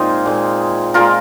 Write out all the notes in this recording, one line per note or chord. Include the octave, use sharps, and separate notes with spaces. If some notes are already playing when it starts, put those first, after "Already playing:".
Already playing: A#2 G#3 C4 D#4 F4 G#4
A#2 G#3
A#2 G#3 F4 A#4